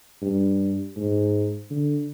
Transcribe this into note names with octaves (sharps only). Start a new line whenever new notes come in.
G2
G#2
D3